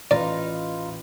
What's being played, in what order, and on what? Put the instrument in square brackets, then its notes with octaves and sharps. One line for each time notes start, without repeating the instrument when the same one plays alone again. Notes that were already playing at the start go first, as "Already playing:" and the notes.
[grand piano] A1 B4 [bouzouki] D#4 F4 [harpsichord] D5